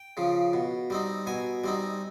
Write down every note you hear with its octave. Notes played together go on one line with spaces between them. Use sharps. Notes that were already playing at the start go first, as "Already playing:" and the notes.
Already playing: G5
C#3 F3
B2
G3 C4 D#4
B2 G#5
G3 C4 D#4